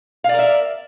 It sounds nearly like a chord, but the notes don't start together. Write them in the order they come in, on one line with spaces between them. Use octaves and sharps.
F5 D5 A#4 E5